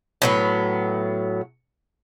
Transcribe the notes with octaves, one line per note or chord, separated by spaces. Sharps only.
A2 F#3 B3